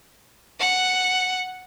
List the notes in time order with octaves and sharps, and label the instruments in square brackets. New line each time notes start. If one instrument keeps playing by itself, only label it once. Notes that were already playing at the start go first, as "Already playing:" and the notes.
[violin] F#5